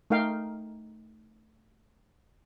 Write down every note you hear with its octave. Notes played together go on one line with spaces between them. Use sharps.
A3 D#4 A#4 F5 G5